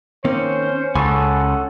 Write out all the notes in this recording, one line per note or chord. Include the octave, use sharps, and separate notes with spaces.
D#3 A#3 C4 C#4 C5
C#2 C#4 A4 F#5 G#5 A5